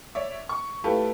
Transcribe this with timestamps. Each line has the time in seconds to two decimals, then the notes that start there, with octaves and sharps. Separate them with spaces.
0.15 C#5 D5 E5
0.49 C#6
0.84 A3 E4 F4 G4 A4 B4